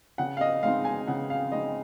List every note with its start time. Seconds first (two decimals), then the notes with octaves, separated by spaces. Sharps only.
0.18 C#3 F#5
0.37 F5
0.41 D#5
0.63 G#3 C4 D#4 F5
0.85 G#5
1.07 C#3 F#5
1.30 F5
1.52 G#3 C4 D#4 D#5